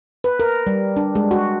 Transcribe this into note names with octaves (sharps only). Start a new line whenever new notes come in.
B4
A#4
G3
D4
G#3
F#4